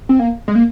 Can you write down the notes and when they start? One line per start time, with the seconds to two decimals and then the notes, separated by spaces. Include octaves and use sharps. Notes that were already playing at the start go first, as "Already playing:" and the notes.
0.09 C4
0.19 A#3
0.48 G#3
0.55 A#3